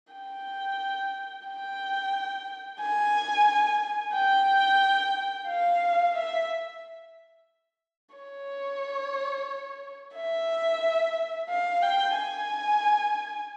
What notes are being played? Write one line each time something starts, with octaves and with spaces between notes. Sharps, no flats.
G5
G5
G#5
G5
F5
E5
C#5
E5
F5
G5
G#5